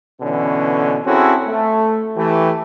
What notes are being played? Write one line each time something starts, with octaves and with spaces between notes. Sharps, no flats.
B2 D3 E3 C#4
C4 C#4 E4 F#4 G#4 A4
A3
E3 A3 G4